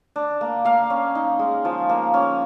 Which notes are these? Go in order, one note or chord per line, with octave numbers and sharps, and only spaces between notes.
D4
A#3
A#3 F5
C#4
D#4
G#3
F3
A#3
C#4